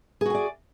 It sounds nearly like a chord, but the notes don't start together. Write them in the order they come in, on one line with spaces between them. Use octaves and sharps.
G#4 F#4 G#5 D5